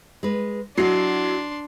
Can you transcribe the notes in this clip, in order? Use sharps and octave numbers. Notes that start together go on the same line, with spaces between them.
G#3 B4
F#3 D4 E4 F#4 D#5 C6 C7